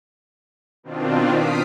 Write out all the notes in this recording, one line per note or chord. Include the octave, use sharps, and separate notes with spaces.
B2 D#3 C4 D4 F4
D#6 F6 B6 C7 D7